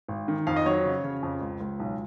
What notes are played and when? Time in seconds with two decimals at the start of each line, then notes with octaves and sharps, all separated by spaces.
0.08 G#1
0.28 D#3
0.47 F2 F5
0.56 D#5
0.66 F#3 C#5
0.85 C#3
1.04 C#3
1.23 F2
1.42 C#2
1.60 C#2
1.80 B1